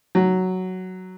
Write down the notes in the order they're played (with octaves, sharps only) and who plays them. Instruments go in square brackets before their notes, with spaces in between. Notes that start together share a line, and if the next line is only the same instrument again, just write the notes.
[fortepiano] F#3